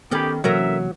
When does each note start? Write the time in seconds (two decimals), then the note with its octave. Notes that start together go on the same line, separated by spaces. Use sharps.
0.11 D#3 B3 C#4 G4 A4 B5
0.44 C3 E3 F#3 A#3 C#4 A#4 E5